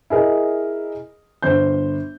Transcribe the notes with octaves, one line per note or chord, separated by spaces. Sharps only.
E4 G#4 A#4 D#5
G1 C5 G6